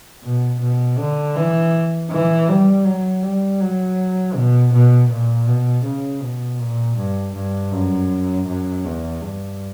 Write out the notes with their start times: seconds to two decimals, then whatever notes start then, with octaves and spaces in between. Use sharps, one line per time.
0.24 B2
0.60 B2
0.98 D3
1.36 E3
2.10 E3
2.49 G3
2.85 F#3
3.22 G3
3.60 F#3
4.35 B2
4.73 B2
5.09 A#2
5.47 B2
5.85 C#3
6.21 B2
6.59 A#2
6.96 G2
7.35 G2
7.71 F#2
8.47 F#2
8.84 E2
9.21 G2